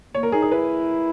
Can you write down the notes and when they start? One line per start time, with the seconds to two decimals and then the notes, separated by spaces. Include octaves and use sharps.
0.14 A#3 C#5
0.23 A#4
0.32 D#4 G#4
0.42 G#4
0.52 E4 B4